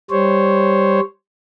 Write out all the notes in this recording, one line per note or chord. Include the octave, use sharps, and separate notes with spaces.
G3 C5 C#5